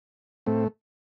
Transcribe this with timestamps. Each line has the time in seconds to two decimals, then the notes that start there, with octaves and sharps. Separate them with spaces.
0.46 A2 A3 C4